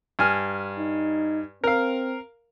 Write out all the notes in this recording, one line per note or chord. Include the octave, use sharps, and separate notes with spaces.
G2 G#5 F6
D#4
C4 A#4 F5